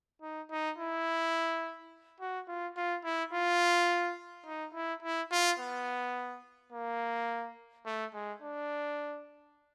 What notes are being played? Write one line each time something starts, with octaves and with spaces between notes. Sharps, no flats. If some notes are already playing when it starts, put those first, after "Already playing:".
D#4
D#4
E4
F#4
F4
F4
E4
F4
D#4
E4
E4
F4
B3
A#3
A3
G#3
D4